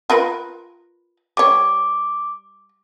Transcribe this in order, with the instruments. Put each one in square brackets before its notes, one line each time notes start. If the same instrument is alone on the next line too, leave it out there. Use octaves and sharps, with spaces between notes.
[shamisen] F4 A#4 B4
[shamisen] G3 C#5 [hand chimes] D6